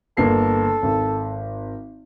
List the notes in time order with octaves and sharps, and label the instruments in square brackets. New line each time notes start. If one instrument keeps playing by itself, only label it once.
[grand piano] G1 A#3 C7 [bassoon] A4
[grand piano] G#1